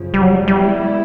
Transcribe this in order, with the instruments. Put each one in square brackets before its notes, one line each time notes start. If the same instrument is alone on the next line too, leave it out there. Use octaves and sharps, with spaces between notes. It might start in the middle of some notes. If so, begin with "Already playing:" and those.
Already playing: [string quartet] F#2 C#3 F3
[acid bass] G3
F#3
G3
[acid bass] G3 [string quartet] G#3 B3 E4